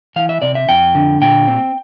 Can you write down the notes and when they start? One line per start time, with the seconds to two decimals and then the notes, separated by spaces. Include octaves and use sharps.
0.16 E3 F5
0.29 E5
0.42 C3 D5
0.55 E5
0.69 F2 G5
0.95 D3
1.21 A#2 G5
1.47 C4